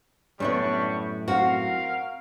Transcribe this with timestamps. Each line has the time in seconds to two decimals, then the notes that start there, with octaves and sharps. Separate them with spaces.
0.40 F#2 A2 G3 B3 C#4 D4 C#6
1.28 C4 F#4 A#4 F5 F#5